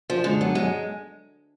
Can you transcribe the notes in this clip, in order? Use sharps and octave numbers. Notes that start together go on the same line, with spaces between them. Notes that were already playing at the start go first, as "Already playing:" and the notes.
F3
D3 G#3
F#3 B3
F#3 G#3